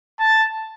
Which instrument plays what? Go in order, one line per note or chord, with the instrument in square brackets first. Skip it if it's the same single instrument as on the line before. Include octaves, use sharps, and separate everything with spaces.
[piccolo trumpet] A5